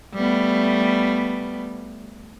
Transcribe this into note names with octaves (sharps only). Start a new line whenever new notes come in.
G3 A3 B3